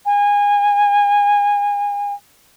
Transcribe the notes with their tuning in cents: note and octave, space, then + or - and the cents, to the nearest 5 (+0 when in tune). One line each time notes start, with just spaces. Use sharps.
G#5 -25